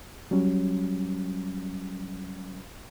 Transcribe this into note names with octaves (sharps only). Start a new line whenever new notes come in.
F#3 G3 C#4